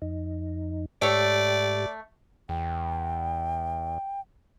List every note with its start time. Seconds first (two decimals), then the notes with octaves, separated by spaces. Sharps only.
0.02 F2 D#4
1.02 G#2 A3 G4 C#5 D5
2.49 E2 G5